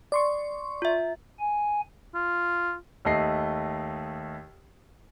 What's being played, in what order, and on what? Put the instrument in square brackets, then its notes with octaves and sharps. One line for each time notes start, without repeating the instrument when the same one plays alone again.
[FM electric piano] D5 C6 C#6
[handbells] F4 E5
[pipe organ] G#5
[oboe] F4
[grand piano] D#2 A3 D#5 C7